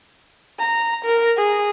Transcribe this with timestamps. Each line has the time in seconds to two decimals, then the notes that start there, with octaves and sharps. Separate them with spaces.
0.59 A#5
1.05 A#4
1.37 G#4